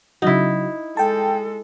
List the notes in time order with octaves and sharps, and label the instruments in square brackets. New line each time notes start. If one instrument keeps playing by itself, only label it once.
[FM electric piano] C#3 F#3 F#4 [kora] D#4 E4
[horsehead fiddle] G#3 A4 [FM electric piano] G5 A5